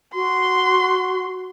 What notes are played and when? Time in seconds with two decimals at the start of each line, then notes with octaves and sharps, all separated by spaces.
0.15 F#4 C6